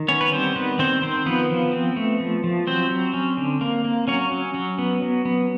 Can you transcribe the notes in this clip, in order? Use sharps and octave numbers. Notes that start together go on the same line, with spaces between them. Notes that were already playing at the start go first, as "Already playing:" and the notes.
Already playing: D#3
B3 C#4 C#5
B4
G3 C4 C5
D#3 B3 B4
D#3 C4 C5
D#3 C4 C5
F3 B3 B4
F3
C4
A3
F3
F3
F#3 C4 C5
F#3
C#4
D3
A#3
A#3
F#3 C#4 C#5
F#3
F#3
B3
F#3
B3